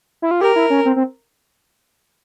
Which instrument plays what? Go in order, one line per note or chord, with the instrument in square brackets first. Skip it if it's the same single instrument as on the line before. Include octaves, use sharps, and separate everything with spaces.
[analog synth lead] E4
F4
[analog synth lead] G4 [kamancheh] A#4
[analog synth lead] E4
C#4
C4
C4